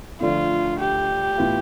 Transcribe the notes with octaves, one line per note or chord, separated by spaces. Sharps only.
D2 D3 F3 A3 D4 F4
G4
A2 E3 B3 F4